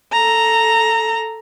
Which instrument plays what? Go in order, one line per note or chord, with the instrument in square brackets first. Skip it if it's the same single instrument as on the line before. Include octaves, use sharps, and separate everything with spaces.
[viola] A4 A#5